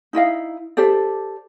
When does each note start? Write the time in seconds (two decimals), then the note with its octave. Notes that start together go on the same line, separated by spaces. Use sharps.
0.13 D#4 E4 D#5 F5
0.77 G4 A4 C5 D5